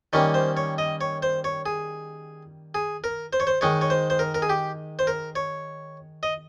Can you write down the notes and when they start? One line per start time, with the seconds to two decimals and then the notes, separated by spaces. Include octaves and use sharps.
0.13 D#3 G3 A#3 C#4 C#5
0.34 C5
0.57 C#5
0.78 D#5
1.01 C#5
1.23 C5
1.44 C#5
1.66 G#4
2.75 G#4
3.04 A#4
3.33 C5
3.40 C#5
3.47 C5
3.61 D#3 G#3 D#4 C#5
3.81 C#5
3.90 C5
4.10 C5
4.19 A#4
4.35 A#4
4.42 G#4
4.50 G4
4.99 C5
5.07 A#4
5.36 C#5
6.23 D#5